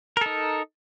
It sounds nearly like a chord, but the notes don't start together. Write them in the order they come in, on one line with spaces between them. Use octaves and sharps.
A#4 A4 D#4